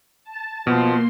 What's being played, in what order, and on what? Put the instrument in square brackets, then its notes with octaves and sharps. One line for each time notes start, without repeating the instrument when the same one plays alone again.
[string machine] A5 A6
[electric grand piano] B2 [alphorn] F3 [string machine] A#3 C6